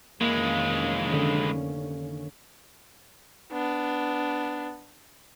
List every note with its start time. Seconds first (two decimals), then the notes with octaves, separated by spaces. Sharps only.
0.21 F1 D#3 E3 G#3 A#3 C#4
1.13 D3
3.52 B3 D4